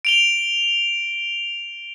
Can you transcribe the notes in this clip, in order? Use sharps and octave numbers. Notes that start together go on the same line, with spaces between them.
D7 F7 G7